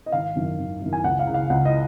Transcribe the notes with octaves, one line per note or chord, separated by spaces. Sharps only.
D#5
G#1 F5
F#2 D#3
G#1
F#2 D#3
G#5
C#2 F#5
F5
C#3
F5
C#2 F#5
D#5